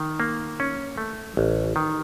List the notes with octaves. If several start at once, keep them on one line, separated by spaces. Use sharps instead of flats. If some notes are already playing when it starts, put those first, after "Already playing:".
Already playing: D#3
A#3
C#4
A3
A1
D#3